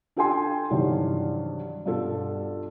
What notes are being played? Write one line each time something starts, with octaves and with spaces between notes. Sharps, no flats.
D4 F4 A4 G5 G#5 C6
G2 C3 D#3 E3 F#3
G2 B2 F4 A4